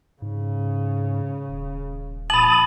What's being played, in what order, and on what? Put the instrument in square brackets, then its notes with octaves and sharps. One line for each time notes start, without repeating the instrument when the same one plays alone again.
[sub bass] G#2 [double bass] C#3
[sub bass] D#1
[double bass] A#1 [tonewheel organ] A5 D#6 [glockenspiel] B5 F#7